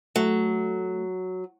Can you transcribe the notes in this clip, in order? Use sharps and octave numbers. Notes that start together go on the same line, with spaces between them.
F#3 A3